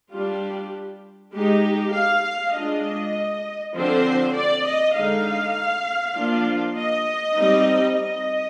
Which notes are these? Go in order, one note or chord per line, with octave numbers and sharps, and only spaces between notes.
G3 D4 F4 G4
G#3 D#4 G4
F5
G#3 D4 F4 D#5
D3 F3 C4 C5
D5
D#5
D3 G#3 D#4 F5
F3 A#3 D4 F4
D#5
G3 C4 D#4
D#5